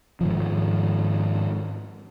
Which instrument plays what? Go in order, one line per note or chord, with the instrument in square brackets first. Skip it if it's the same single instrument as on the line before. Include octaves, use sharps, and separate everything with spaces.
[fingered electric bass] G#2 D#3 F3